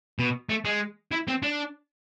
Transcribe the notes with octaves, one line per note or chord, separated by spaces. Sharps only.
B2
A3
G#3
E4
C4
D4